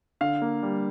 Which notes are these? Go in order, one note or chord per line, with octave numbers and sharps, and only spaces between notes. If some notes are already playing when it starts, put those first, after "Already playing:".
D3 F5
A#3
G3